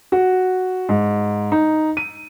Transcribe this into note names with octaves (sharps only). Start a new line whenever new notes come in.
F#4
G#2
D#4
D#7